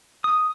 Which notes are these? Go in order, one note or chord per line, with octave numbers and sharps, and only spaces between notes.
D#6